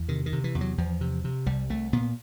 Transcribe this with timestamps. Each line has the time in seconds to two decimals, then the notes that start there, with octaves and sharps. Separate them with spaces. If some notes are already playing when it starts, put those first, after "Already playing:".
Already playing: E2
0.09 C3 D#3
0.26 D#3
0.33 C3
0.44 E3
0.55 E2
0.61 F#3
0.78 E2 F3
1.01 C3
1.24 C3
1.46 C2 G3
1.70 C2 A3
1.93 A#2 B3